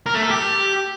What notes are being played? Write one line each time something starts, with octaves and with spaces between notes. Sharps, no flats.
A#4
A3
A4
G4